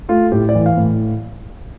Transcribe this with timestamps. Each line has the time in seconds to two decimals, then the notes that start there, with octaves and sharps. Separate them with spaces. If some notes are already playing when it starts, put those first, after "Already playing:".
0.09 A3 F4
0.32 A2 G4
0.49 D5
0.55 E3
0.66 F5
0.77 A2